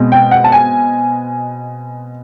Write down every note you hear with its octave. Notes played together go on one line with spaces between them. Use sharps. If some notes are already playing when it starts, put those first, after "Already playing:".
Already playing: B2 G#3 C4
G5
F#5
A5
G#5